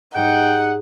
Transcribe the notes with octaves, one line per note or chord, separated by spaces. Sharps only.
G#2 G3 D#4 F#5 G5